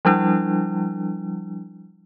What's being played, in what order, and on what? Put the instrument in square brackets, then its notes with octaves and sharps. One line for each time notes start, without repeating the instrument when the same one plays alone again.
[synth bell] F3 G3 D4 E4